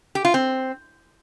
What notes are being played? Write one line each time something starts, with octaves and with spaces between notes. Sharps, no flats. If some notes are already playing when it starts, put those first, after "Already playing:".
G4
F4
C4